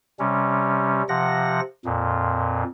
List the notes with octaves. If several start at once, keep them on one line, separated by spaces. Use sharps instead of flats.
C3 G3 C#4
C3 F3 F#5 A#6
F2 A#2